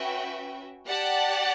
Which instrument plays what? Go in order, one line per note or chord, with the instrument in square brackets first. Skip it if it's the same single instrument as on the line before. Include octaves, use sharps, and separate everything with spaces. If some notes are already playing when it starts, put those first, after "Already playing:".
Already playing: [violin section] C#4 F#4 B4 E5 G5
G4 D5 F#5 A5